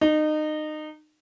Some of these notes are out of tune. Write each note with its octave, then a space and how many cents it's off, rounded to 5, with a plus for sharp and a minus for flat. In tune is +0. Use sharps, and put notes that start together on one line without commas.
D#4 -25